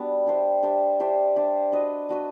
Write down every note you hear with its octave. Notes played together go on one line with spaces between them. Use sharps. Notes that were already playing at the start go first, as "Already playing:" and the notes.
Already playing: G3 B3 D4 F#4
D4 G4 C5 E5
D4 G4 C5 E5
D4 G4 C5 E5
D4 G4 C5 E5
D4 F#4 B4 D#5
D4 F#4 B4 D#5